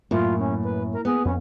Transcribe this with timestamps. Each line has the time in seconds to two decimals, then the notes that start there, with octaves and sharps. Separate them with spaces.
0.11 F#2 A2 A#3 F4
0.38 C#4
0.63 B4
0.92 A#4
1.05 B3 G#4
1.25 F2 C#4